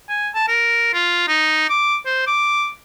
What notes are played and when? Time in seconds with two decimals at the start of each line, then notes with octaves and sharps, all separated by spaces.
0.09 G#5
0.34 A5
0.48 A#4
0.93 F4
1.28 D#4
1.69 D6
2.06 C5
2.27 D6